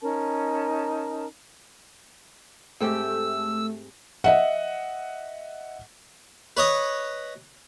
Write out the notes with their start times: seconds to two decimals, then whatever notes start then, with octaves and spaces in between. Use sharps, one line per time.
0.01 C#4 D#4 A#4 A5
2.80 G#2 A3 C4 G4 E6
4.24 D#5 E5 F#5
6.57 B4 C#5 D#5